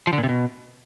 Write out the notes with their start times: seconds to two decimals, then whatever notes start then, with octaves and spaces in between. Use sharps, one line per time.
0.07 F3
0.13 D3
0.18 A#2
0.24 C3
0.29 B2